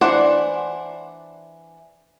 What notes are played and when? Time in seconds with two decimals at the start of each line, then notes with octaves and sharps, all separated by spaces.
0.01 E3 D4 C5 D5 F#5